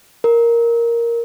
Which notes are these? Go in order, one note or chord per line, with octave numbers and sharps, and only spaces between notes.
A#4